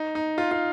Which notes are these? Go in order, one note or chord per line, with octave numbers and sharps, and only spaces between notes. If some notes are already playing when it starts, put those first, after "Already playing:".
Already playing: D#4
D#4
F4
F4